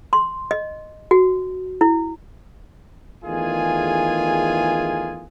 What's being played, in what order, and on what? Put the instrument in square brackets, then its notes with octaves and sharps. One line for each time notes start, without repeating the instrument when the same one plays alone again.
[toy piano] C6
D#5
F#4
E4
[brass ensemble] E2 D#3 A3 F4 G#4 G#5